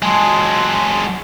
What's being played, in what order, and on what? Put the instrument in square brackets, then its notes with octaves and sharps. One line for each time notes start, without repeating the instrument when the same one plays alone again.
[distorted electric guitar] F#3 G#3 [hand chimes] G#5 A5 C6